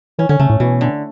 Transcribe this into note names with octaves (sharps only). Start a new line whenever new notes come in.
E3 C#4
D3 C#4
C#3 A3
A2
B2 E3
D3